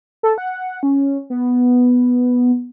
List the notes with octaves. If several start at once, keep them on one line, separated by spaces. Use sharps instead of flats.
A4
F#5
C#4
B3